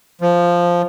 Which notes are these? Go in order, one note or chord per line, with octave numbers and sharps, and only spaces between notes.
F3